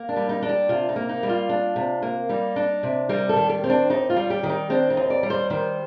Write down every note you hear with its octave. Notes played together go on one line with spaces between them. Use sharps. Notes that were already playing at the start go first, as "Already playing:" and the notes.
Already playing: A#3
D4
G3
D#4
D4
G4
C3 F4
D#4
A#3
D#4
G3
F4
D4
C3
A#3
G3 D#4
D4
C3
G3 A#4
A4
D#3
G4
C4
D4
D#2 D#4
F4
G3
G4
D#3
D#4
C4 D4
D#4
D#2
D5
G3
C5
D#3 C5